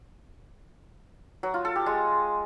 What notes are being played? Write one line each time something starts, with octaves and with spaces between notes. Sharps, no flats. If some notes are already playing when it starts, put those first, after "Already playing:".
F#3
F4
A4
G4
G#3